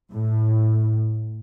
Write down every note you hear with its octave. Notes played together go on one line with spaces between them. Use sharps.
A2